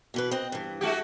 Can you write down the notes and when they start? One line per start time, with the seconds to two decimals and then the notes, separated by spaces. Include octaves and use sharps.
0.14 B2 E3 B4
0.31 C4 D#5
0.52 G2 E3
0.81 G#3 F#4 G4